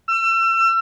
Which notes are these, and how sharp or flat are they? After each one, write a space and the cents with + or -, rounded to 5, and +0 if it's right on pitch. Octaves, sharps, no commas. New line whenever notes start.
E6 +35